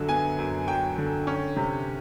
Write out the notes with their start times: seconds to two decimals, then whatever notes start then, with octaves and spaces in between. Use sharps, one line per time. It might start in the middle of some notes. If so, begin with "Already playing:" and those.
Already playing: F#2 D3 F#3
0.08 B3 G#5
0.38 F#2
0.67 F#3 G5
0.98 D3
1.27 C#4
1.56 C3